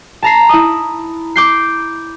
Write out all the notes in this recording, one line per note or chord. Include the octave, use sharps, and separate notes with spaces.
A5 A#5 C7
E4 D#6
D6 G6 C7